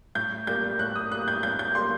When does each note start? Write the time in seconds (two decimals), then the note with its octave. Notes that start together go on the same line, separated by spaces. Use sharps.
0.15 A2 G6
0.47 G3 A#3 G6
0.79 A2 F#6
0.96 D#6
1.12 G3 A#3 F#6
1.28 G6
1.43 A2 G6
1.59 G6
1.75 G3 A#3 C6